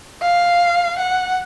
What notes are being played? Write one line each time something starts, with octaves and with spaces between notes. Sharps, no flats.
F5
F#5